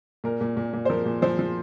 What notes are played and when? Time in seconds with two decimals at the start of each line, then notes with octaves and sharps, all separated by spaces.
0.24 A#2 A#4
0.41 A#2
0.57 A#2
0.73 A#2
0.85 C5
0.90 F3 A#4
1.06 A#2
1.22 F3 C5
1.39 F3